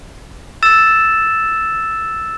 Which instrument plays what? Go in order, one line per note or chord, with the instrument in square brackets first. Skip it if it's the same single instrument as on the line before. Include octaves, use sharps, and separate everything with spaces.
[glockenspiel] E6 A6 E7